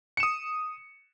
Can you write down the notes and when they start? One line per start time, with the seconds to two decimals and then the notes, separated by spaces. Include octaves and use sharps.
0.17 C#7
0.20 E7
0.23 D#6